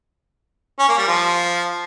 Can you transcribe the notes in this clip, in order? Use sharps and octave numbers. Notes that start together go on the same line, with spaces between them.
C#4
A#3
G3
F3